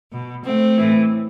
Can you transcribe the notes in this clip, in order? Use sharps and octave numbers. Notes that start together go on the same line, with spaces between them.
B2
A3 C4
A2 E3